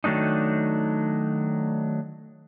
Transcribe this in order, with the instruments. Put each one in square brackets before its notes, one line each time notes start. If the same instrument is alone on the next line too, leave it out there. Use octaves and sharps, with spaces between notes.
[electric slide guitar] D#3 F#3 A3 D4 D#4